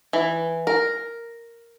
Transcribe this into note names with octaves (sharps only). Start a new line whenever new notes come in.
E3
A#4